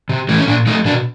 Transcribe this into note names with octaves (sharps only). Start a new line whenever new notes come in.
C3
E3 A3
C#4
A#2 D4
F3 A3 D#4
B2 D4